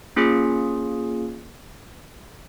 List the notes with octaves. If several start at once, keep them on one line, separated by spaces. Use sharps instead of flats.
A#3 C#4 F4 G#4